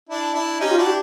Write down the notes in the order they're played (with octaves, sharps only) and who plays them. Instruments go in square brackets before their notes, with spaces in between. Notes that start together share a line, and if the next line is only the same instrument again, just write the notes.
[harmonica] D4 E4
D4 E4
[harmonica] C#4 D#4 [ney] G4
[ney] F4
[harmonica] D4 E4 [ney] F#4
[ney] G4